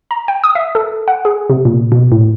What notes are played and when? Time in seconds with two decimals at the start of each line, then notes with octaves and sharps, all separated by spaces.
0.11 A#5
0.28 G5
0.44 D#6
0.55 E5
0.75 A4
1.08 F#5
1.25 G#4
1.50 C3
1.65 A#2
1.92 B2
2.12 A2